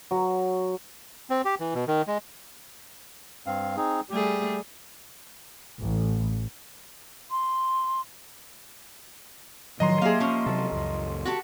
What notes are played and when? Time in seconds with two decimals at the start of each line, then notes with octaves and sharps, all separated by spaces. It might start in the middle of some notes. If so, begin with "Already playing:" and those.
0.11 F#3
1.30 C4
1.45 G4
1.60 E3
1.74 B2
1.88 D#3
2.07 G#3
3.46 G2 C4 F5
3.77 C4 D#4 G#4
4.10 G3 A3 G4 G#4
5.80 A1
7.31 C6
9.80 A2 D#3 F3 F#3 D#5 A#5 C6
10.01 A#3 G4 G#4 E5 F5
10.20 F3 C#4
10.46 C3 F#3 A4
10.72 C#2 F#2
11.25 F#4 G4 A4